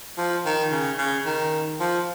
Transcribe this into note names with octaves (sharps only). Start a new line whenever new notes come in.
F3
D#3
C#3
C#3
D#3
F3